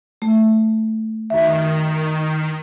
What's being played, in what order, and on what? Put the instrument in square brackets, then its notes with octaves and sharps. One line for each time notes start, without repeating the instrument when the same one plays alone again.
[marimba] A3
[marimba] F#2 E5 [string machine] D#3